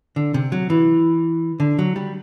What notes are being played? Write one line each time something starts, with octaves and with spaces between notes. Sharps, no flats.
D3
C3
F#3
E3
D3
F#3
G3